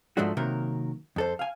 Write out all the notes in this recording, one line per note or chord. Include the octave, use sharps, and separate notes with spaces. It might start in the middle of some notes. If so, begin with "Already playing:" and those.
G#2 F3 G#3 A3 D4 F#4
C3 D#3 F#3 A#3 A#4
F2 A4 C5
F5 G#5